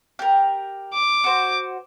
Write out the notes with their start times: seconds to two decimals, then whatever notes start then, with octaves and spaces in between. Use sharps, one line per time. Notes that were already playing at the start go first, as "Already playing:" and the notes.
0.19 G4 A#4
0.93 D6
1.24 F#4 C5